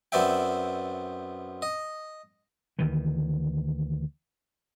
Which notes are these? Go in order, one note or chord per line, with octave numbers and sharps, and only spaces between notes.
F#2 B3 C4 D5 E5 G5
D#5
D2 D#3 E3